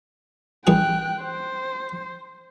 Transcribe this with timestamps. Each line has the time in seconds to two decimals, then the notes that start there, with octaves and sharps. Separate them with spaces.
0.67 A1 G3 G#4 G5 F#6
1.22 C5